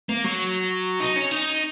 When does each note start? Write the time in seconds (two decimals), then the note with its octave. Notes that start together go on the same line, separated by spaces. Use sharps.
0.09 A#3
0.24 F#3
1.00 D#4
1.16 C#4
1.31 D#4